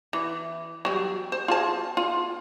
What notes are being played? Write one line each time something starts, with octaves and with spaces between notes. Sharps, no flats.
E3
F#3 G3
C5
F4 G#4 A5
F4